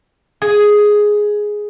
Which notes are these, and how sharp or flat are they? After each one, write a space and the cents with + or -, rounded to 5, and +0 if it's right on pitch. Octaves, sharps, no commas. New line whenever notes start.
G#4 +5